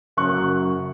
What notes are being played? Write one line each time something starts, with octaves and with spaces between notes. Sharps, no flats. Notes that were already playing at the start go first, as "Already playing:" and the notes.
F#1 F#2 F#3 C#6 F#6